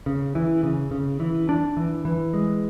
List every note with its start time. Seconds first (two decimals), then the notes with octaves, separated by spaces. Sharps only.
0.06 C#3
0.35 E3
0.63 C#3
0.91 C#3
1.20 E3
1.49 D4
1.77 E3
2.05 E3
2.34 G#3